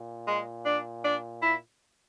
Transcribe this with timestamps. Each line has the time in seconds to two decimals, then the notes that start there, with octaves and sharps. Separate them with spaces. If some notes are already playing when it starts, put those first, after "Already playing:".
Already playing: A#2
0.28 G#3
0.66 D4
1.04 D4
1.42 E4